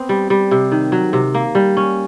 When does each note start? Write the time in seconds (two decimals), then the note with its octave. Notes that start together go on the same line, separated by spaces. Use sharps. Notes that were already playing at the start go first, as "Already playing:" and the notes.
Already playing: B3 C4
0.09 G3
0.30 G3
0.51 C3
0.72 D#3
0.92 F#3
1.13 C3
1.35 A#3
1.55 G3
1.77 C#4